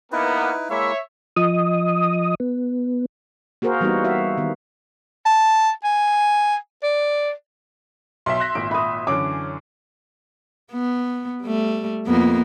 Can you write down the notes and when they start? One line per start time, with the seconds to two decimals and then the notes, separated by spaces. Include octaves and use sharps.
0.12 A#3 B3 D#4 E4 B4
0.70 G#3 A#3 E4 C#5 E5
1.36 F3 D#5 D#6
2.40 B3
3.62 A#3 F#4 G#4 A#4 C5
3.80 E3 G3 A#3 B3 D#4 F#4
4.04 F#4 E5 F5
4.38 D#3 B3
5.26 A5
5.84 G#5
6.83 D5
8.26 B1 E5 C6
8.40 F#6 A#6
8.55 G#1 A#2 D7
8.71 B5 D#6
9.07 F#2 D3 E3 C#4 D6
10.72 B3
11.42 G3 A3
12.07 F2 A#3 B3